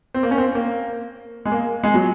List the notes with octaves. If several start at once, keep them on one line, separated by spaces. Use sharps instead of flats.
C4
A#3
C#4
C4
A#3
G#3
A#3
G#3
F#3